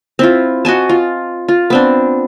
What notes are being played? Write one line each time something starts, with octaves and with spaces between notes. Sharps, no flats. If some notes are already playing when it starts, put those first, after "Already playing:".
C4 E4 F4
F#4 D#5 G#5 A5
F4
F4
B3 C4 D4